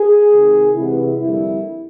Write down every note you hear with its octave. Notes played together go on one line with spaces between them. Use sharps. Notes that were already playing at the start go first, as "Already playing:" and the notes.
Already playing: G#4
C3 D#3 G#3
C3 E3 G#3 B3 E4
F2 D3 G3 A#3 E4